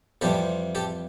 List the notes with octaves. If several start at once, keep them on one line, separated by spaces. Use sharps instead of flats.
F2 C3 E3 G3 G4 A4
G4 A4